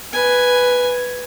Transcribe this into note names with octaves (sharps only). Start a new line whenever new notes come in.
B4 G#5